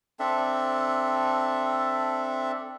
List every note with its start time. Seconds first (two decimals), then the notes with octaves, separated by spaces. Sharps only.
0.20 C4 D4 A4 E5